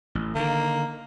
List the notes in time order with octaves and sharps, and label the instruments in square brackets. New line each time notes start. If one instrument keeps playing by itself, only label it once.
[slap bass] A1
[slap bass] D3 D#3 [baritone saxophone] A#3